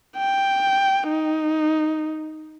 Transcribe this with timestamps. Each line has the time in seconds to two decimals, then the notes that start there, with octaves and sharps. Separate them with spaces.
0.17 G5
1.09 D#4